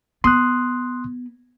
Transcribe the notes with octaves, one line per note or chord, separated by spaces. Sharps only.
B3 C6 D#6 F#6